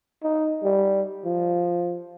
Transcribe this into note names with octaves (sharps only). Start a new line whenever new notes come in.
D#4
G3
F3